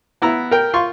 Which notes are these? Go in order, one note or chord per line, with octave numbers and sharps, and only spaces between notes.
B3 E4 A#5
A#4 G5
F4 C6 C#6